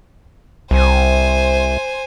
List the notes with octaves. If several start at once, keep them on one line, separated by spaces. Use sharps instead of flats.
C2 C5 G#5